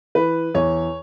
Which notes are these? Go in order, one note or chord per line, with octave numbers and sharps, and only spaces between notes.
E3 B4
E2 C#5